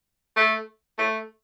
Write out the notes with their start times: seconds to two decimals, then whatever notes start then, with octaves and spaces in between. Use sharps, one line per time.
0.37 A3
0.98 A3